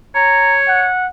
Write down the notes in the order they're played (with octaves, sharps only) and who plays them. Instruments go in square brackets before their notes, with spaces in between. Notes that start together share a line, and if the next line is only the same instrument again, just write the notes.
[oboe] C#5 [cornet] A#5
[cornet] F#5